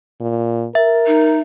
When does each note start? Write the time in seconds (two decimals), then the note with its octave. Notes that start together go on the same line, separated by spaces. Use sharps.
0.20 A#2
0.75 A#4 E5
1.07 D#4